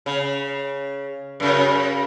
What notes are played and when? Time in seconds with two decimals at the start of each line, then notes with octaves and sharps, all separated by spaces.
0.06 C#3
1.40 F#2 C#3